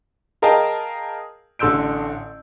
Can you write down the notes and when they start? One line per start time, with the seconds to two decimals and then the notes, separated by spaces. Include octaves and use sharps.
0.42 G#4 A#4 D#5 F5 G5 A5
1.59 A1 D3 C6 E6 G6 D7